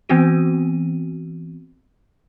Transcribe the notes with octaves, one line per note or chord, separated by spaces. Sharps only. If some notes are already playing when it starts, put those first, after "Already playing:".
E3 B3 C4 F#4 D#7